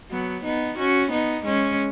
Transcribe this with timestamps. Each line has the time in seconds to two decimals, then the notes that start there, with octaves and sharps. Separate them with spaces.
0.11 F#3 B3
0.44 B3 D#4
0.78 C#4 F#4
1.11 B3 D#4
1.45 G#3 C#4